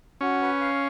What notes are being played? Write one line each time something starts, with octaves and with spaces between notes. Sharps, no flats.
C#4 F#4
B4
F5